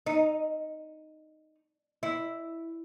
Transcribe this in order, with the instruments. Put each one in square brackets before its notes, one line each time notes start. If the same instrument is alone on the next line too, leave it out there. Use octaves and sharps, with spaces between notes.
[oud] D#4
E4